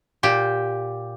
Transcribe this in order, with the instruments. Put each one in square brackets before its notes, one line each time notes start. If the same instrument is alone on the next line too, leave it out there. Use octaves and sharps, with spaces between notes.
[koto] A#2 G4